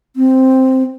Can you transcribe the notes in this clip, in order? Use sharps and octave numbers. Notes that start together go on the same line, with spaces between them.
C4